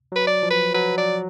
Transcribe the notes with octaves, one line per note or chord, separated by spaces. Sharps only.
F#3 B4
D5
F3
B4
F#3 B4
D5